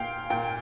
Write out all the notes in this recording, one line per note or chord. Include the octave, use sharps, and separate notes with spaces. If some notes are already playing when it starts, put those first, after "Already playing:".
Already playing: A#2 F5 G5
A#2 G5